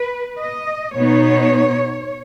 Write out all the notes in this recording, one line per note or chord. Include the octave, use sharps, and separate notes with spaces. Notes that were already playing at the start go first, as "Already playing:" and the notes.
Already playing: B4
D#5
B2 B3 D#4 C#5